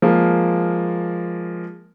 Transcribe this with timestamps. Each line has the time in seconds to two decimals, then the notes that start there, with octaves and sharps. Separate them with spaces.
0.02 F3 G#3 A#3